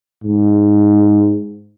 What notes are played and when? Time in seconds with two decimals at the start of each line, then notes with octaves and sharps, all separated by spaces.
0.24 G#2